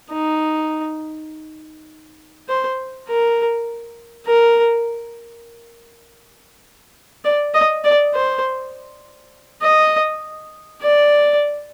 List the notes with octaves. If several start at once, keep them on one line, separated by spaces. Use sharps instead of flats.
D#4
C5
A#4
A#4
D5
D#5
D5
C5
D#5
D5